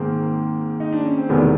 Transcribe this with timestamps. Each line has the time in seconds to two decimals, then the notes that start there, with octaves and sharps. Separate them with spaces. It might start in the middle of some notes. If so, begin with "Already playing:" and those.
Already playing: G#2 D#3 G#3 A#3 C4
0.80 D#4
0.93 D4
1.05 C#4
1.18 C4
1.29 E1 E2 C3 D#3 G3 A3 B3